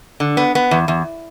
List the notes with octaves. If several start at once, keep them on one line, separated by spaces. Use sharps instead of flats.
D3
B3
B3
E2
E2